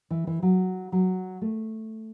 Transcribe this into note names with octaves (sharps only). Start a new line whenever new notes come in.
E3
E3
F#3
F#3
A3